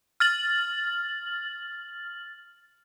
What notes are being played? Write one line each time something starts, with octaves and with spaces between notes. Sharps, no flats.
F6 A6 F#7